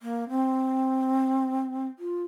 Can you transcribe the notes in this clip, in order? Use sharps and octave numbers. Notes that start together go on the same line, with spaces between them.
A#3
C4
F4